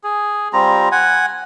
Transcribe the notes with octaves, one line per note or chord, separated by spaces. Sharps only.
G#4
G3 C4 F4 A#5
F#5 G#5